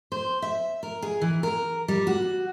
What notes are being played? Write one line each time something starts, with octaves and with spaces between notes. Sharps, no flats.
C5
E5
A#4
G#4
E3
A#4
G3
F#4